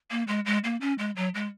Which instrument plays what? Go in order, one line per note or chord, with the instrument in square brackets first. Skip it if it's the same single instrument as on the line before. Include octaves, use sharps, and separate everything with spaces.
[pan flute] A#3
G#3
G#3
A#3
C#4
G#3
F#3
G#3